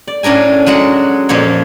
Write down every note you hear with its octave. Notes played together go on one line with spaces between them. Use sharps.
D5
A2 C#4 D4 A#4 G#5
F#3 G#3 F#4 F#5
F2 A#2 F3 A#3 C#5